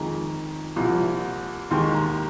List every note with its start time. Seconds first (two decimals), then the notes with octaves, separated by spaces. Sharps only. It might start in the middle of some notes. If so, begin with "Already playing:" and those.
Already playing: F2 D#3 G#3 A#5
0.76 C2 A#2 F3
1.71 D#2 D#3 G#3 C6
1.94 A#5